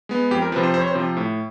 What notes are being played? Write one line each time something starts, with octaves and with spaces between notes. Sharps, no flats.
G#3 B3
F2 G4
A#4
C3 F3 B4
C5
F2 C5
C#5
C5
C3 F3
A2